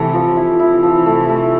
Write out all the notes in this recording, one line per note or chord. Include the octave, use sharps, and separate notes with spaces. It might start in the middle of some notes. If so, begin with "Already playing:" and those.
Already playing: C3 E3 A3
F3
E4
C3 E3 E4
F3
A3
A3